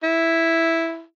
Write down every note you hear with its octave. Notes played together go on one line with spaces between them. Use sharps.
E4